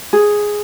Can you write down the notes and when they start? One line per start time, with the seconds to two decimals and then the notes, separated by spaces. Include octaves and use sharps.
0.13 G#4